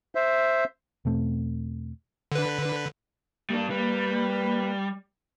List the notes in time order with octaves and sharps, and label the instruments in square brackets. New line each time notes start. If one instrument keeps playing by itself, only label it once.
[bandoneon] C5 E5
[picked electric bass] E2 B2 A3 C4
[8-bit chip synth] D3 B4
[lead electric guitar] G3 D4 [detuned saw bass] A#3
[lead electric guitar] G3 [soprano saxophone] B4